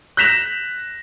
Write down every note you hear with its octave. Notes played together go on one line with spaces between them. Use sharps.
F#6 G6 A#6 B6 E7 F7